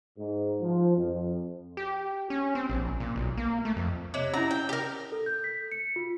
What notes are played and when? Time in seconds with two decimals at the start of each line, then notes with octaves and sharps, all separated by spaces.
0.18 G#2
0.61 F3
0.97 F2
1.77 G4
2.30 C#4
2.55 C4
2.70 A#1
3.00 A#2
3.16 B1
3.37 A#3
3.65 A3
3.77 F2
4.14 C3 C#5 D#5 D6
4.34 C#4 E4 A#5
4.51 G5
4.69 G4 A#4
5.12 A4
5.26 G6
5.44 B6
5.71 C#7
5.96 F4